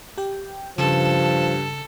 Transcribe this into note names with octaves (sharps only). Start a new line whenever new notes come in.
G4 G5
G2 C#3 F3 A4